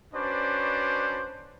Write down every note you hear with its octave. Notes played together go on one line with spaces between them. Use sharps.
C#4 D4 F#4 B4 C5 D5